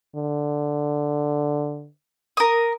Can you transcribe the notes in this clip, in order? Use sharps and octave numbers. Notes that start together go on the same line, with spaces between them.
D3
A#4 D#6